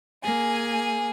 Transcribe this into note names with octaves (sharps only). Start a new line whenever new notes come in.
A#3 G#4 G#5